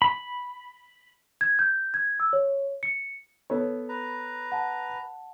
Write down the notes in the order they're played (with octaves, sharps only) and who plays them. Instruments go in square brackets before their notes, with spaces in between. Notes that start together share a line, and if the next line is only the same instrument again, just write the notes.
[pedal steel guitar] B5
[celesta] G#6
G6
G#6
E6
C#5
C#7
[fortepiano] B3 A4 C#5
[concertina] B4 A#5
[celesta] F#5 A5